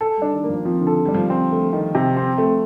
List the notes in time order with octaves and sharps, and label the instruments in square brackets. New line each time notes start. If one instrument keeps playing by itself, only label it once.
[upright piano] A4
[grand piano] G3
[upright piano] D4
[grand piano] D#3
[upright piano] A#3
[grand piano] F3
[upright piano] F3 [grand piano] C4
[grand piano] D3
[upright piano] A4
[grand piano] G3 [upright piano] D4
[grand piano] F3
[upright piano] C4
A3
D#3
C3
C4
A3